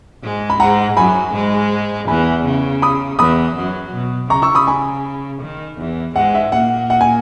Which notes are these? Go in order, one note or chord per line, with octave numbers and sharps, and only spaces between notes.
G#2 G#3
B5
G#2 G#3 F#5 A#5
F#2 F#3 G#5 B5
G#2 G#3
E2 E3 G#5 B5
C#3
B5 D#6
E2 E3 B5 D#6
F#2 F#3
B2
C#3 A#5 C#6
C#6 E6
B5 D#6
G#5 B5
D#3
E2 E3
G#2 G#3 F#5
E5
A#2 A#3 F#5
F#5
G#5